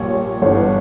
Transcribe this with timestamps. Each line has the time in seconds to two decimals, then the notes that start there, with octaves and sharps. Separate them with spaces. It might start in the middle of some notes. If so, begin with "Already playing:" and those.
Already playing: A#1 A#2 G3 C#5
0.42 G1 G2 E3 C#5
0.57 B4